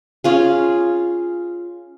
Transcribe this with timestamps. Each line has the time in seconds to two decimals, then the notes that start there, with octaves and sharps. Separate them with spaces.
0.24 C#4 F4 G#4